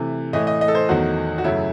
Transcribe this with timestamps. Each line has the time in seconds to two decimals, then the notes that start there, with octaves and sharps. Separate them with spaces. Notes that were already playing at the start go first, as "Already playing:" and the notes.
Already playing: C3 E3 A3
0.33 A2 E3 A3 D#5
0.47 D#5
0.61 D#5
0.68 A4
0.75 C5
0.89 E2 D#3 F#3 A3 F#4
1.38 F#4
1.44 F#2 C#3 F#3 A3 E4